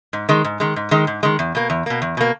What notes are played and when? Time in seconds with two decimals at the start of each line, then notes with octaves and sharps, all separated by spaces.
0.13 G#2
0.29 D#3 G#3
0.45 G#2
0.60 D#3 G#3
0.76 G#2
0.91 D#3 G#3
1.07 G#2
1.23 D#3 G#3
1.39 E2
1.55 B2 A#3
1.70 E2
1.86 B2 A#3
2.02 E2
2.17 B2 A#3